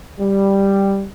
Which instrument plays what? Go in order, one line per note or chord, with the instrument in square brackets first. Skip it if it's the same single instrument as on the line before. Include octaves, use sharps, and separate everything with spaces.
[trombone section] G3